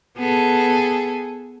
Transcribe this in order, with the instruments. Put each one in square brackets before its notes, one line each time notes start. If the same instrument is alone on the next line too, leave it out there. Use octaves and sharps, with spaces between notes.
[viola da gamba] B3 G#4 A4